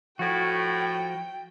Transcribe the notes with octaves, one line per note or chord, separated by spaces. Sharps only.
A2 F3 F#4 G5